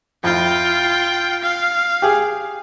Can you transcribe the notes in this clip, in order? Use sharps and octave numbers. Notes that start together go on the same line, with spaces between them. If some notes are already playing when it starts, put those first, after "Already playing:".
F2 E4 F4 G5
F5
G4 G#4